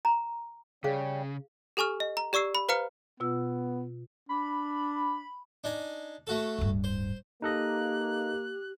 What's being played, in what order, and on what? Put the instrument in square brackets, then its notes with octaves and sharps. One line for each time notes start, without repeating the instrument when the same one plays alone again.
[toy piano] A#5
[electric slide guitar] C#3 [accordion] G3 C#4 G5 [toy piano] G#4 F5
[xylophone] G4 A4 G#5 C#6 F6
D#5
A#5
G4 D5 C#6 E6 C7
B5
B4 C5 F5 A#5 F6 C#7
[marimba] B2 F4 E6 [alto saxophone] B3
[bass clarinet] D4 [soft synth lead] B5
[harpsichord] D4 D#4 G#5
A3 F#4 A4
[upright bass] D1 G2
[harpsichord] C5
[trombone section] A#3 [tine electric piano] D#4 A4 D#5 [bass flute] G4 [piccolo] F#6